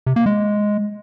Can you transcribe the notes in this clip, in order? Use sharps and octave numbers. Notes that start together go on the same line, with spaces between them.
C3
A#3
G#3